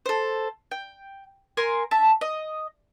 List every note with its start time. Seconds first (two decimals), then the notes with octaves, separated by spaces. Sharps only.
0.06 A4 C5
0.71 G5
1.57 A#4 G#5 C6
1.91 E5 A5
2.21 D#5